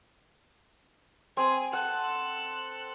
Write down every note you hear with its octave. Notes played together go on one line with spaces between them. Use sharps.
C4 G#4
A4 F#5 F#6